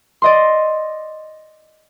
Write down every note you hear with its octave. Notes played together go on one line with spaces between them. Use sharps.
D5 D#5 C6